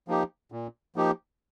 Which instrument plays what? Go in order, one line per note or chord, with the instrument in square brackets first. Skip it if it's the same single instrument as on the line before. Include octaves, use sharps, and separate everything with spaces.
[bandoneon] F3 A#3 D#4 G4
A#2
F3 A#3 D#4 G4